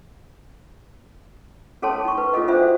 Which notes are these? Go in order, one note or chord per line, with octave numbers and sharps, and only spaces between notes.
C#4 G#4 A4 C#5 A5 C6
D#4 C#6
B4
C#4 F4 G#4 A4 D#5
D4 F4 A4 C5 E5
F#4